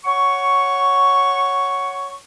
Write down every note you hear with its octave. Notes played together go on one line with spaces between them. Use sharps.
C#5 F#5 C#6